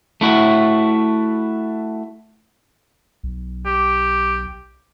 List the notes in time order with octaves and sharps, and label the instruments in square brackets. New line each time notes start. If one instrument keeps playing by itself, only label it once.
[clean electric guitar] A3 E4 F#4
[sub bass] B1
[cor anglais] G4